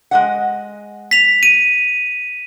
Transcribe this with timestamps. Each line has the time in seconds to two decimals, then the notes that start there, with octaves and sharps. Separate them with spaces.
0.11 G#3 D#5 F#5
1.11 B6 F7
1.43 D#7